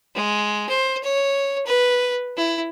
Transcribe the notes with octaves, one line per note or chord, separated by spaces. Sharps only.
G#3
C5
C#5
B4
E4